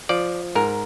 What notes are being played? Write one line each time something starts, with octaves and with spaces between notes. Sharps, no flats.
F3 D5
G#2 A#4